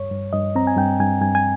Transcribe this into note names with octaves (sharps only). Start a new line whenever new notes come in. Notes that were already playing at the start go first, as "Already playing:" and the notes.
Already playing: G2 C#5
G2
G2 D#5
C4 A#5
G#5
G2 G5
G2 G#5
G2 G#5
G#5